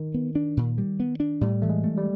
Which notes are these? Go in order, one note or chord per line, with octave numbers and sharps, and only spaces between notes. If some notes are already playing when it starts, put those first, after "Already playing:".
Already playing: D#3
B3
D4
A#2
G3
B3
D4
A2 G3
E3 A3
G#3
A3
G3